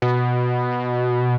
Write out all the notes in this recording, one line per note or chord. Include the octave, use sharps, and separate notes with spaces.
B2